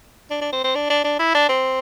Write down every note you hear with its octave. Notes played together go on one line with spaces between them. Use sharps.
D4
D4
C4
C4
D4
D4
D4
E4
D4
C4